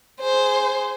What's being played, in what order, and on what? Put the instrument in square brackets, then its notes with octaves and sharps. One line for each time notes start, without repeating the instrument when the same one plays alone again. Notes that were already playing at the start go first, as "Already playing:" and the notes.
[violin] G#4 C5